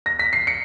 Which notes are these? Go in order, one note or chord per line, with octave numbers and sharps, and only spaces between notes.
A#6
B6
C7
C#7